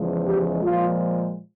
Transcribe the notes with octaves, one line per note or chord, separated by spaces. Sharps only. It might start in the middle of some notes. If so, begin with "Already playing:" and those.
Already playing: E2 C#3 F3 G#3
G4
A#2 F3 G#3 F4